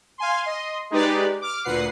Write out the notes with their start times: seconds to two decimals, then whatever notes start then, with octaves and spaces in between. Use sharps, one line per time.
0.18 F5 G#5 C6
0.43 D#5 C6
0.90 G#3 D#4 G4 B4 D5
1.41 D6 F6
1.64 D2 A#2 B4 F#5 C7